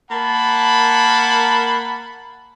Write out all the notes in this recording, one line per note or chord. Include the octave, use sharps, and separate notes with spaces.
A#3 A#4 F#5 A5 B5